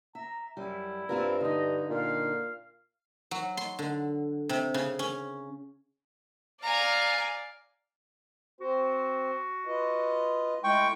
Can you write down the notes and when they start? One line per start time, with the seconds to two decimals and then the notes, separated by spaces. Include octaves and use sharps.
0.15 E5 A#5
0.57 F#2 G3 E4
1.09 G2 C4 F4 A#4
1.41 D3 D#4 D#5
1.90 A#2 F5
3.31 F#3
3.57 C6
3.79 D3
4.49 C3
4.74 C#3
4.99 C#4
6.63 D5 F5 G#5 A#5
8.61 C4 F#4 C5
9.66 F4 B4 D#5
10.64 G#3 A3 E4 G5 C#6